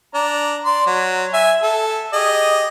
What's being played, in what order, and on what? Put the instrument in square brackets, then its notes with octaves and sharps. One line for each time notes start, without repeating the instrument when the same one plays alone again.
[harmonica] D4 A#5
D5 C6
F#3
E5 G#5
A4
G4 G#4 D#5